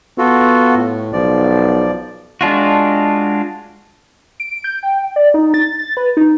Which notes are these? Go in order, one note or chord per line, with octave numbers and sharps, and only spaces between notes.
B3 F4 F#4 A4
A2
B1 F3 D5
G#3 D4 F4 F#4
D7
G6
G5
D5
D#4
A6
A6
B4
D#4